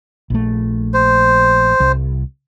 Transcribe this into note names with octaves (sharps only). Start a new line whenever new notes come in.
A#1 A3
C5
C2